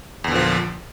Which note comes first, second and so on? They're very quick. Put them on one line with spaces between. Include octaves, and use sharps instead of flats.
E2 D3 A#2 F3